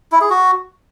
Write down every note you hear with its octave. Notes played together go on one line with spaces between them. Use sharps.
E4
G#4
F#4